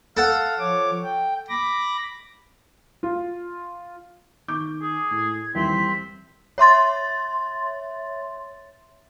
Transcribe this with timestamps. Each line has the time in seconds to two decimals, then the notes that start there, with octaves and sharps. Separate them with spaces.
0.17 A4 F5 F#5
0.59 F3 C#5 D6
1.03 G5
1.49 B5 D6 A#6
3.03 F4
4.48 D#3 C#6 D6 G6
4.82 G#4
5.11 A2 G#6
5.55 D#2 E3 G3 C4 B6
6.58 C#5 E5 C6 A6